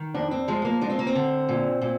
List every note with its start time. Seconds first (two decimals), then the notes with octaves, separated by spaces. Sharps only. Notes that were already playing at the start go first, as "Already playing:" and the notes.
Already playing: D#3
0.14 F2 D4
0.31 C4
0.48 F3 G#3
0.65 A#3
0.81 G#3 D4
0.90 C4
0.99 A#3
1.07 C4
1.15 D3
1.49 A#2
1.82 A#2